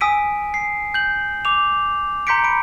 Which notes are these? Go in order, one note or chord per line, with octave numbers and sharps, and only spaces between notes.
G#5 D#6 E6 B6 D7 D#7
C7
G6 F#7
D6 F7
A#5 C6 G6 B6 C#7 D7
A#5 B5 D7